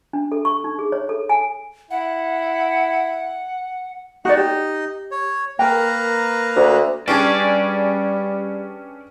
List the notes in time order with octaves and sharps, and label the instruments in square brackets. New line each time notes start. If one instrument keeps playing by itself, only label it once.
[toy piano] D4
A4
C#6
D#4
G#4
C#5
A4
G#5
[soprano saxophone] E4 [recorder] F#5
[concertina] D#4 D#5 [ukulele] F#4 D5
[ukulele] G4
[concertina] C#5
[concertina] A#3 B4 A#5 [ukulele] A#4 G5
[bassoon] D2
[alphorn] G3 [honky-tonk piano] C#4 D4 G#4 [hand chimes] B4 G5 D7 [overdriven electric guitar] D5